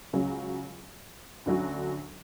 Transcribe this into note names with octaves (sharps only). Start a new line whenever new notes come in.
C#2 C#3 F#3 C#4
D2 D3 F#3 C#4 F#4